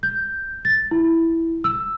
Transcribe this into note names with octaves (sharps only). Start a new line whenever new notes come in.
G6
A6
E4
E6